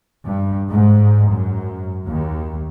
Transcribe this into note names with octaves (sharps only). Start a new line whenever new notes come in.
G2
G#2
F#2
D#2